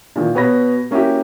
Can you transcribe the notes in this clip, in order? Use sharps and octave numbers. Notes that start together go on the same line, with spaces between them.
A#2 D#3 E3
B2 B3 C#5 B5 A#6
A#3 C#4 E4 F#4 G4